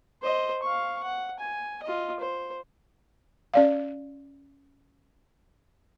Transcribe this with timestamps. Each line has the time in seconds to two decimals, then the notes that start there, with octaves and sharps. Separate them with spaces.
0.22 C5 D#5
0.63 F5 C#6
1.03 F#5
1.39 G#5
1.83 F4 D#5
2.19 C5
3.54 C#4 D5 F5